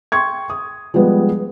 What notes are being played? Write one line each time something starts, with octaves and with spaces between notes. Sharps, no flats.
G5 C6 C#6 G#6
D#6
F3 G3 G#3 B3